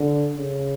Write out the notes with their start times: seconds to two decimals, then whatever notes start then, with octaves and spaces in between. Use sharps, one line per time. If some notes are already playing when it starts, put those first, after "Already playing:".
Already playing: D3
0.37 C#3